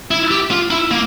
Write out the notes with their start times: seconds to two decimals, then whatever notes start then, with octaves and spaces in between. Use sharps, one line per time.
0.11 E4
0.31 G4
0.51 F4
0.71 E4
0.91 A#3